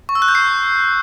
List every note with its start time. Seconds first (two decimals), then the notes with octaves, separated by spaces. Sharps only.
0.09 C#6
0.15 E6
0.22 F#6
0.28 G6
0.35 C7